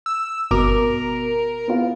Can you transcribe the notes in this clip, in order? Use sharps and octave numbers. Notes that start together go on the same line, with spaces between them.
E6
G1 B2 A#4 D6
B3 E4 F4